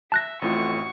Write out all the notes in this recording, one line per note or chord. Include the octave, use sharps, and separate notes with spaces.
E5 A5 F#6 A#6
A1 F2 A2 F4 F#4 C#6